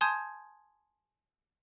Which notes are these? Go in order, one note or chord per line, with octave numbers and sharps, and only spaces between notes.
G#5 A5 C6 D#6 G6 G#6